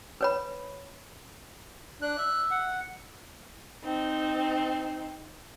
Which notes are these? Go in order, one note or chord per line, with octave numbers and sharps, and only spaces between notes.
B4 C#5 B5
D4 F#6
E5
F#5
C4 D#4